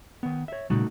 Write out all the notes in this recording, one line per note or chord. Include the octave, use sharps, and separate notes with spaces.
D#3 B3
C#5 E5
A#2 C#3 G3 A3 D#4 F#4